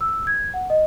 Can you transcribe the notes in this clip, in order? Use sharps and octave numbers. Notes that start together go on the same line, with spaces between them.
E6
G#6
F#5
D#5